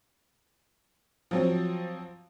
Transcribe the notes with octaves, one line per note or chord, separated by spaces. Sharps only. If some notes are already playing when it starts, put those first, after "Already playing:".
F3 F#3 C4